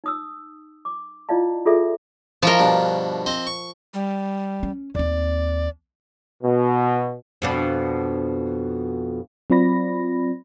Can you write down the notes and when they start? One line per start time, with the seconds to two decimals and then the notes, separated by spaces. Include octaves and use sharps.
0.04 D#4 D#6 E6
0.85 D6
1.29 E4 F4 D5 D#5 F5 A5
1.65 F4 F#4 G#4 A4 D5 E5
2.43 F3 E4 A#4 C#5 D#5
2.59 G2 B2 D4
3.26 C4 D#5
3.47 C#6
3.94 G3
4.63 C#4
4.95 D#2 C4 D5
6.42 B2
7.42 F2 B2 D4
9.50 F#3 C4 F4 D5 B5 A#6